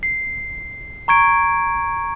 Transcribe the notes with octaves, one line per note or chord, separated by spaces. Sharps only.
C7
A#5 C#6 G#6 D7